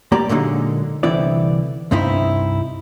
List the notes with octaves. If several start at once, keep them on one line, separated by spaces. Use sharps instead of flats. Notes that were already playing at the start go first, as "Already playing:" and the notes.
G3 A#3 G4 D5 A#5
A#2 D3 F#3 G#3 A#3 D#4
C2 D3 E3 C4 E4 D5
C2 G2 C4 D#4 E4 E5